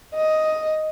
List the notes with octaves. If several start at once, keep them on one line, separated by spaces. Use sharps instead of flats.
D#5